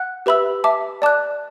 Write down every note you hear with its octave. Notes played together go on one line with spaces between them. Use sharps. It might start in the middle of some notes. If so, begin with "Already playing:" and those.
Already playing: F#5 F#6
G4 B4 E5 B5 E6
E5 A5 D6
D5 A5 D6 F#6